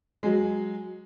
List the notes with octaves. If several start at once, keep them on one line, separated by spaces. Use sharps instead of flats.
F#3 G#3